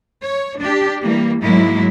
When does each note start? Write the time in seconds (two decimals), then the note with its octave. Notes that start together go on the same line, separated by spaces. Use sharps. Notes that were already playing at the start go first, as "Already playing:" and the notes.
0.21 C#5
0.59 D4 G4
1.03 E3 G3 A#3
1.41 G#2 F#3 G#3 A#3 E4